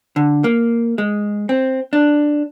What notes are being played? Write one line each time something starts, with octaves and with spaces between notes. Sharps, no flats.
D3
A#3
G#3
C4
D4